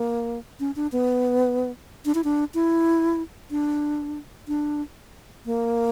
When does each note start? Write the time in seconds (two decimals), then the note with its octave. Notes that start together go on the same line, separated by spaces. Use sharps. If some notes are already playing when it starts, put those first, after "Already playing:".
Already playing: A#3
0.60 C#4
0.76 D4
0.92 B3
2.05 D4
2.15 E4
2.24 D4
2.54 E4
3.51 D4
4.48 D4
5.46 A#3